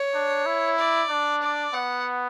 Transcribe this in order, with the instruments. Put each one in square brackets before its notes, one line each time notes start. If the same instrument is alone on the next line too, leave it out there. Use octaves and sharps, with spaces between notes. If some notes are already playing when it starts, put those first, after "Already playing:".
Already playing: [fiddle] C#5
[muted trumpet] D4
E4
[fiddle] D5
[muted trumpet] D4
[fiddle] D5
[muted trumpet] B3 [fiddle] F#5